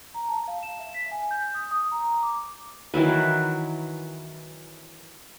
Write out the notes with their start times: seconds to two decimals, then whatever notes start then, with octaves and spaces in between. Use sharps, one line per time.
0.14 A#5
0.29 A5
0.48 F5
0.63 E7
0.80 E5
0.94 B6
1.11 G#5
1.31 G6
1.54 D#6
1.71 D#6
1.92 A#5
2.23 D6
2.94 D#3 E3 F#3 B4